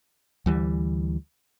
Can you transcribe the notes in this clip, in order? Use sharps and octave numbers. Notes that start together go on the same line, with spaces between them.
D2 E3 G3